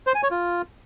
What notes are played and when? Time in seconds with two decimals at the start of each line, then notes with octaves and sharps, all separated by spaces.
0.07 C5
0.15 G#5
0.23 C#5
0.31 F4